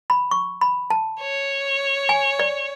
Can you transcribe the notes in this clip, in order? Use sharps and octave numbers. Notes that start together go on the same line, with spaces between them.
B5
C#6
B5
A5
C#5
G#5
D5